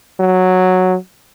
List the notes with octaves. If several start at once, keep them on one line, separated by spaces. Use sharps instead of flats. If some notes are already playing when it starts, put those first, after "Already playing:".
F#3